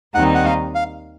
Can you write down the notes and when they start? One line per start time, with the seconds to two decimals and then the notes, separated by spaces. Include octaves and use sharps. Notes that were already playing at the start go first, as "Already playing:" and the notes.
0.14 D#2 D#3 G3 C4 D#4 F#5
0.34 F#5
0.45 F5
0.75 F5